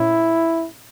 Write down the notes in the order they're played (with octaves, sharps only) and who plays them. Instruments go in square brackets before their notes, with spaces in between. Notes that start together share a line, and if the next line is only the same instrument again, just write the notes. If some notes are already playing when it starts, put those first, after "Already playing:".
Already playing: [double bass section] A#2 A3 C#4 [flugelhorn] E4